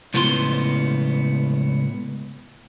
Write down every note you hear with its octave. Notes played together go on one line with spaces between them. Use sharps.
C#2 A2 B3 F4 B5 C6